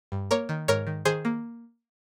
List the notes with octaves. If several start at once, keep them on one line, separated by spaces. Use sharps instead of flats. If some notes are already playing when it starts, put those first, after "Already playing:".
G2
A#3 A#4 C#5
D#3
G#2 A#4 C#5
D#3
D#3 G#4 C5
A#3